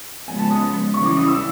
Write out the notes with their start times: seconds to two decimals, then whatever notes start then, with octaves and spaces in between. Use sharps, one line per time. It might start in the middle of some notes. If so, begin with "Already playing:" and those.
0.28 C#3 F3 G#3 B3 G#5
0.39 A5
0.50 D#6
0.94 C#3 E3 G3 C#6
1.05 D6
1.17 D#6
1.28 E6